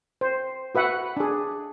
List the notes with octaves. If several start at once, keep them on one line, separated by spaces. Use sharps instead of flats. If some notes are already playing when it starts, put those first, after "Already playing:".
C5
F#4 B4 E5 F#5
D4 G#4